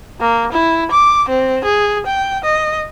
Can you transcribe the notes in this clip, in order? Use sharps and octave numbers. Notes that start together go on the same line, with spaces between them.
A#3
E4
D6
C4
G#4
G5
D#5